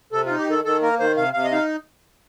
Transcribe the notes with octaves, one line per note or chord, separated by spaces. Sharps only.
C3 A4
F4
D#4
G4
D#3 A4
D#3 A4
A#3 A#4
D#3 C5
C3 F5
C3 F5
D#5
D#4 F5